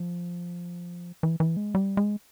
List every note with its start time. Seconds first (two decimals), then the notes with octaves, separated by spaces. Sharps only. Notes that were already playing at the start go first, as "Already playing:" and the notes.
Already playing: F3
1.23 E3
1.40 E3
1.57 G#3
1.75 G3
1.97 G#3